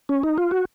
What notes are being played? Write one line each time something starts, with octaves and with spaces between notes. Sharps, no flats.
C#4
D#4
F4
F#4